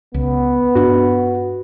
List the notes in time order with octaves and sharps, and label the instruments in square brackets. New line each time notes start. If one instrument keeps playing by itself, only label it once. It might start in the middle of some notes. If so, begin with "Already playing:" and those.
[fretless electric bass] C#2 [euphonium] B3
[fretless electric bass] G2 D4 [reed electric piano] F#4